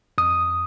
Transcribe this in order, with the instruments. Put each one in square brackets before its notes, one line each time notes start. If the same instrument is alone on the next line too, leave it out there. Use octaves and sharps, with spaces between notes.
[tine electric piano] F2 D#6